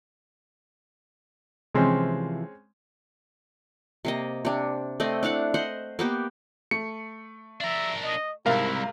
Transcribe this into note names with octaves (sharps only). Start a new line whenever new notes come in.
C3 E3 F3 G#3 C4 C#4
C3 A#3 D#5
C3 D4
A3 C4 D5 D#5
D4 E4 F5 F#5
C5 D#5 F#5
A#3 B3 G4
A3 C#7
D4 A#4 E5
D#5
C2 G#2 C3 E4 A#4 F5